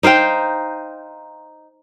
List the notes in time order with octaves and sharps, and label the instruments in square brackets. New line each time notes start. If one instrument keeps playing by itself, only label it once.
[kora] D#4 C5 F5 G5